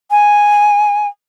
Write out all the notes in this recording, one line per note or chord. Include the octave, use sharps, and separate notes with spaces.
G#5